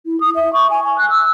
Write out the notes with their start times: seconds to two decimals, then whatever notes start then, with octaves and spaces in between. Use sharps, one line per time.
0.06 E4
0.20 D#6
0.35 E5
0.53 C#6
0.70 G#5
0.84 G#5
0.98 F#6
1.10 E6